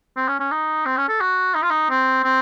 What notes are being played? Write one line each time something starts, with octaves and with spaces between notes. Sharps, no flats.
C4
C#4
C#4
D#4
C4
C#4
A4
F#4
D#4
F4
D#4
C4
C4